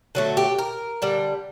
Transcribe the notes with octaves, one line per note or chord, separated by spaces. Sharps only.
D3 F#3 A3
G4
A#4
D3 G3